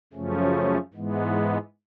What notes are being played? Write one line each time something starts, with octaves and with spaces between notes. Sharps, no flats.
F#2 C#3 F3 A3 C#4
G#2 E3 G#3 B3